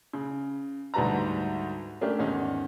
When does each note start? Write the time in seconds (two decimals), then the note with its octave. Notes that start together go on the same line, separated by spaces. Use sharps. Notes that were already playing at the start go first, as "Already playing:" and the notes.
0.13 C#3
0.94 D2 G#2 G3 B4 A5 A#5
2.01 A3 C#4 D4 G4 A#4
2.19 E2 G#2 D#3 C#4 D#4